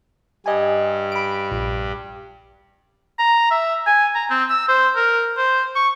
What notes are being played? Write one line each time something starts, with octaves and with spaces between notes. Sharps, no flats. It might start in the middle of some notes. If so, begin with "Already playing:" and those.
G2 G3 D#5 G#5
B5 D7
A#1
A#5
E5
G#5
A#5
C4
E6
C5
A#4
C5
C#6